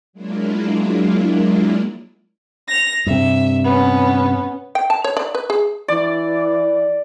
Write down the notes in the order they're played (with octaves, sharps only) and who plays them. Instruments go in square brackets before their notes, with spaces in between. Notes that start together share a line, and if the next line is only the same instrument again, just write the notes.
[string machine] F#3 G#3 A#3 D4 E4 F4
[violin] A#6 F7
[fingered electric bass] G2 C3 [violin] E5
[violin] B3 C#4
[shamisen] G5
A5
C#5
D5
B4
G#4
[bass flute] E3 [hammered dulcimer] D5